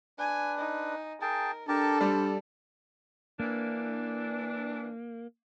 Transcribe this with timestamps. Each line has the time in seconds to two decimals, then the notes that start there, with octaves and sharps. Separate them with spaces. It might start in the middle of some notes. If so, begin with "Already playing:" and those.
0.19 D4 B4 G#5
0.58 D#4
1.22 G#4 A#4 G5 A5
1.68 D4 G4 A4 A#4 A5
2.01 G3 C5 D5
3.40 E3 A#3 D4